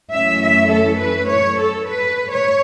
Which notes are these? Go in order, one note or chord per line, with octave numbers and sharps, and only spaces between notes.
F#2 E3 A3 C#4 E4 E5
E5
A4
B4
C#5
A4
B4
C#5